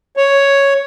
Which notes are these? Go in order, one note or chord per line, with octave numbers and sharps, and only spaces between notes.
C#5